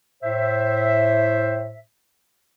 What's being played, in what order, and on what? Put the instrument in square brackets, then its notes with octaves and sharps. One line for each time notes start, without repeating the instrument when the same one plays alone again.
[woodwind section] A2 C5 E5